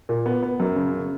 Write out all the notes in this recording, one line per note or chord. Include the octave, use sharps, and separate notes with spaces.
A#2
B3
B3
F#2
C#3
C#3